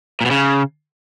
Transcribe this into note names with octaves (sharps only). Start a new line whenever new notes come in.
A#2
B2
C#3